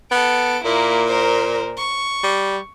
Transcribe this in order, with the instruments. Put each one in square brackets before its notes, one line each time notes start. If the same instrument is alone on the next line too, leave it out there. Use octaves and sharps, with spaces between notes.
[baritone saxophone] B3 [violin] A4 D7
[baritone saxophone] A#2 [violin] A#3 E4
[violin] A#4 C5
C#6
[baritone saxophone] G3